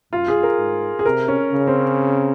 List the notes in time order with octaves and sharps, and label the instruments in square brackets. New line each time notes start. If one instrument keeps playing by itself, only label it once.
[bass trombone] F#2 [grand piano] F4
[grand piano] G#4
A#4
[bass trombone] G#2
[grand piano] G#4
[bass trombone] C3 [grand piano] A#4
[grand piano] C#4
[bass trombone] C#3
[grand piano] C4